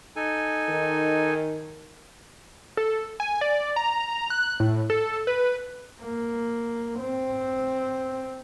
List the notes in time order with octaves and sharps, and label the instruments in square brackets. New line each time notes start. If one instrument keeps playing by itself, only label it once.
[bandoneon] D#4 A4 G#5
[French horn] D#3
[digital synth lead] A4
G#5
D5
A#5
F#6
A2
A4
B4
[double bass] A#3
C4